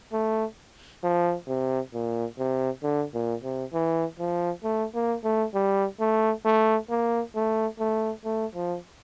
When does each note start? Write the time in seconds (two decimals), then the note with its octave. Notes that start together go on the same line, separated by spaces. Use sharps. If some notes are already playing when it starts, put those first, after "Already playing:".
0.13 A3
1.04 F3
1.48 C3
1.94 A#2
2.38 C3
2.83 D3
3.14 A#2
3.44 C3
3.73 E3
4.19 F3
4.64 A3
4.95 A#3
5.24 A3
5.54 G3
6.00 A3
6.45 A3
6.90 A#3
7.35 A3
7.80 A3
8.25 A3
8.55 F3